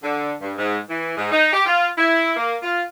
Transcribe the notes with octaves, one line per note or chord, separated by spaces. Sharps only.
D3
G2
G#2
E3
G#2
D#4
G4
F4
E4
A#3
F4